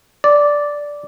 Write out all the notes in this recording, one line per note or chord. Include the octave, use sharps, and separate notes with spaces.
D5